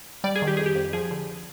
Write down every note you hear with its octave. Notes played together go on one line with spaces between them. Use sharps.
G3 D5
G#4
D#3
G4
F2 G#4
G4
F2
F3 G#4
D3